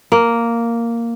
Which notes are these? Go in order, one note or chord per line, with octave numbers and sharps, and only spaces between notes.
A#3